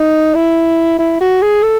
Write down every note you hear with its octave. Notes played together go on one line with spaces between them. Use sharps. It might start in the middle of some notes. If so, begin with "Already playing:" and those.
Already playing: D#4
E4
E4
F#4
G#4
A4